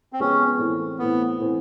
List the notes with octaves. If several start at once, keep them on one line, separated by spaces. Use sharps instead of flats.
C4
F3 G#3 B3 C#4
A2 E3 A3 C4
A2 E3 A3 B3 C4
A2 E3 A3 C4